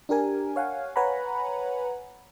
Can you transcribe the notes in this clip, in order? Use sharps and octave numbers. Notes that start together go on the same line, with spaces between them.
D4 G4 A#4 G#5
C#5 F5 F#5 G#5
B4 C#5 F#5 G#5 A#5 B5